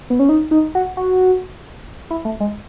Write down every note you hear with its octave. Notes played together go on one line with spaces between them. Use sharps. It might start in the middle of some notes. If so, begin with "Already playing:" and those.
B3
C#4
D#4
D#4
F#4
F#4
E4
A3
G#3